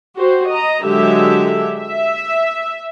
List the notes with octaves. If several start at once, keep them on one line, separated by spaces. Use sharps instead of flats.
F#4 G4 C5
D#5 A#5
D3 F#3 G#3 G4 E5
E5